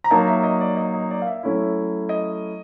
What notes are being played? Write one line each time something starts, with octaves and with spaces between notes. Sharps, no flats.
A#5
F#3 A#3 D#4 A5
E5
D#5
D5
D#5
D#5
D5
F5
E5
F#3 A3 C#4 E4
D#5